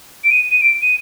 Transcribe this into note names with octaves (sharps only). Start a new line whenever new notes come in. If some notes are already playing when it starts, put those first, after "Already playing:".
D7
D#7
D#7
D7
D#7